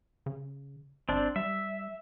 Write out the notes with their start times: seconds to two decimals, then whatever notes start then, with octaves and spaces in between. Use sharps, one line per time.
0.26 C#3
1.09 G#1 C4 D4
1.36 G3 E5